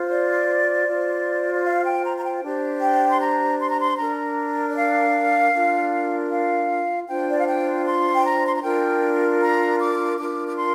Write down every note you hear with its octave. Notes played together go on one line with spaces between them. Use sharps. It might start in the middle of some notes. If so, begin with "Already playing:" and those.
Already playing: F4 C5
D5
F4 C5
D5
F5
G5
A#5
A#5
G5
D4 G4 C5
G5
C6
A#5
C6
A#5
C6
D4 A#4 A#5
D5
F5
D4 F4 A#4
F5
D4 F4 C5 G5
D5
F5
G5
C6
G5
A#5
C6
A#5
D4 F4 A#4 G5
A#5
D6
D4 F4 A#4 D6
D6
C6